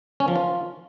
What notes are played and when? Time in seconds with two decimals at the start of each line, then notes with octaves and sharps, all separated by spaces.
0.20 C#4
0.28 F3
0.36 F4